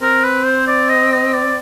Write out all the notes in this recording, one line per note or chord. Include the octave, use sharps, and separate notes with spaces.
C4 A#4
B4
C5
D5
D#5
D#5
D5